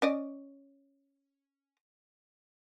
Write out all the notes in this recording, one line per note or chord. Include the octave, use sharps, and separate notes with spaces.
C#4 D5 D#5